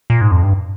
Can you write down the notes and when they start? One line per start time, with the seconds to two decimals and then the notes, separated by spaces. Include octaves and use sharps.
0.10 A#2
0.21 G#2
0.32 F2
0.43 G2